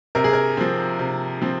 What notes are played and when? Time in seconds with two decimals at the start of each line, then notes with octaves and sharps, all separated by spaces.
0.15 C3 A#4
0.24 G#4
0.33 A#4
0.57 F3 C4
0.99 C3
1.42 F3 C4